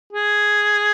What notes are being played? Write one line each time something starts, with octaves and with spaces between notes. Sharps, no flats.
G#4